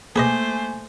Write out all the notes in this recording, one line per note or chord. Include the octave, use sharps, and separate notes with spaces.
A3 A#3 G#4 B4 C5 D#5 G#5 D6